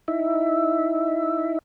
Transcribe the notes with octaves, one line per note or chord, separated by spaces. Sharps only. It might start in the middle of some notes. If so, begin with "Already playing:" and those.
D#4 E4 E5